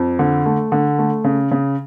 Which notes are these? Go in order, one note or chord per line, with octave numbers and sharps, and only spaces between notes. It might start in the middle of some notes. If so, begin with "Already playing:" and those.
Already playing: F2
D3
A3
D3
A3
C#3
C#3